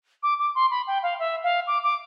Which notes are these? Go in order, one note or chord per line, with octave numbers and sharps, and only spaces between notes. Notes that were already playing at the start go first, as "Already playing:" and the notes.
D6
D6
C6
B5
G5
F5
E5
F5
D6
D6